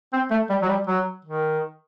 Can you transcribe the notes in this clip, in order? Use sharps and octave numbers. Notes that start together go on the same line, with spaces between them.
C4
A3
G3
F#3
G3
F#3
D#3